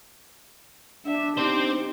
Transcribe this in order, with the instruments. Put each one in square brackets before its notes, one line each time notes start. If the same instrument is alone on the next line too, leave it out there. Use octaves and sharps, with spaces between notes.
[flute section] D4 [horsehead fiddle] E5
[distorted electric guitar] C4 C5 [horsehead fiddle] D#4 G4